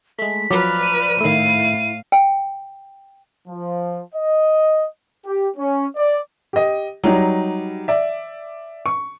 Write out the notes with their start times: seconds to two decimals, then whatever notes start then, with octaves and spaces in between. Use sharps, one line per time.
0.19 G#3 A3 B6
0.50 F3 F#3 B4 D5 A#5 F6
0.82 D#7
1.20 A2 D#3 A3 E4 F5
2.12 G5
3.48 F3
4.15 D#5
5.26 G4
5.57 C#4
5.96 D5
6.53 G4 D#5
7.04 F#3 G3 D#4
7.88 D5 E5
8.86 C#6